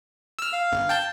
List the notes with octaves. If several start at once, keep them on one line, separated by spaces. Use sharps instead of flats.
E6 F6
F5
G1
G5 A5 G6